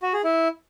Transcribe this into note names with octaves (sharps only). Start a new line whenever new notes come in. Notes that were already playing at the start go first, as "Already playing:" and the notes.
F#4
G#4
E4